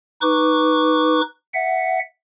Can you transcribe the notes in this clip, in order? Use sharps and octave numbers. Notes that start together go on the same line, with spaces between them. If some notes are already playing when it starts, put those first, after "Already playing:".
D#4 B4 C#6 D6
E5 F#5